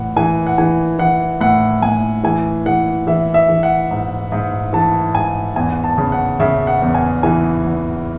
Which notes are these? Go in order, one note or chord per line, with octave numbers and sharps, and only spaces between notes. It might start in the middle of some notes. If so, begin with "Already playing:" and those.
Already playing: A2 E3 F#5
E3 G#5
F#5
E3 G#5
E3 F#5
A2 F#5
A2 G#5
E3 G#5
E3 F#5
E3 E5
E5
E3
F#5
G#2
G#2
E3 A5
G#2 G#5
E2 G#5
A5
C#3
F#5
C#3 E5
F#5
E2
G#5
E3 G#5
E2